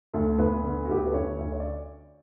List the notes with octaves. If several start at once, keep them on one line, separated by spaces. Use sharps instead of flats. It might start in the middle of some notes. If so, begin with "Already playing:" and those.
D2 A3 A4
D2 B3 B4
D3
F#4
D2 G4
A4
B4
D2 C#4 C#5
D2
C#5
D5